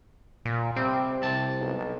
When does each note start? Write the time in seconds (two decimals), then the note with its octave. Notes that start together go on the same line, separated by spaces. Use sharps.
0.45 A#2
0.76 C3 G3 C4
1.23 C2 C3 A5
1.61 B1